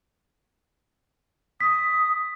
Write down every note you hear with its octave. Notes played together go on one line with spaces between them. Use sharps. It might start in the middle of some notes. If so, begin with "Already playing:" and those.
D#6 B6